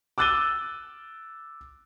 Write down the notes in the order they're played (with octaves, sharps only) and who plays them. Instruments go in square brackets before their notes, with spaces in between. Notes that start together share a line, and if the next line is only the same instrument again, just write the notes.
[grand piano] D6 E6 F#6 A6 D#7 G7